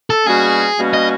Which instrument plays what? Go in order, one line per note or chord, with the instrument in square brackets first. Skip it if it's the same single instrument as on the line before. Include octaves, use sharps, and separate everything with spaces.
[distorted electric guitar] A4
[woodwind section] B2 G3 A#3 C#4 F#4 [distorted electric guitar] G#4
[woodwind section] B2 G3 A#3 C#4 F#4
[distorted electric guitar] D#5